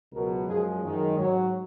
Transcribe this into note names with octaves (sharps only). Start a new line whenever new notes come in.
C#2 B2 F#3 A#4
F#2 F3 G#3 G#4
F#2 D#3 G#3
G#2 F#3 C#5